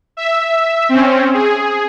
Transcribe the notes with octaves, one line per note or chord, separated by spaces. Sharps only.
E5
C4 C#4
G#4